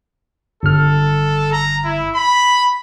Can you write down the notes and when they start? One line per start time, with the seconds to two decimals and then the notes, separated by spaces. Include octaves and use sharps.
0.63 G1 A4 F6
1.52 A#5
1.84 E4
2.15 B5